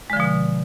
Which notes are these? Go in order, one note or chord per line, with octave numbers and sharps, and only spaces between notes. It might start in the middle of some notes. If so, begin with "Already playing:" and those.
B2 D3 F3 G#3